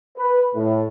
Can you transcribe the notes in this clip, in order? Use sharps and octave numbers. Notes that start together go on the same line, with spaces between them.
B4
A2